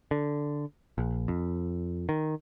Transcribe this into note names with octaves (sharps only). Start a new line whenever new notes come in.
D3
A#1
F2
D#3